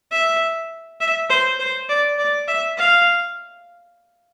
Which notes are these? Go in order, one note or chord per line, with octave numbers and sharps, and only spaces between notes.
E5
E5
C5
C5
D5
D5
E5
F5